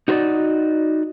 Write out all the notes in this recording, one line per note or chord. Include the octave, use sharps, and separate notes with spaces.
D#4 F#4 A#4 C5 D5 D#5